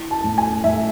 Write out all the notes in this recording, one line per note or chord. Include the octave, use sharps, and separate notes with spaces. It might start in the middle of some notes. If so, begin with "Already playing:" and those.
Already playing: E4
A5
A2
G#5
A2 E5